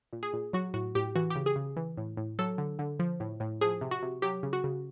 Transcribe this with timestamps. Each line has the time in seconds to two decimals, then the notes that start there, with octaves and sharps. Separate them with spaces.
0.13 A#2
0.23 G#4
0.33 A#2
0.53 F#3 F#4
0.74 A2 F#4
0.95 A2 G4
1.15 E3 F#4
1.30 G4
1.35 C#3
1.46 G#4
1.56 C#3
1.77 E3
1.97 A2
2.17 A2
2.39 F#3 A4
2.58 D3
2.79 D3
2.99 F3
3.20 A2
3.40 A2
3.61 F3 G#4
3.81 C3
3.91 F#4
4.03 C3
4.22 F#3 G4
4.43 C#3
4.53 F#4
4.64 C#3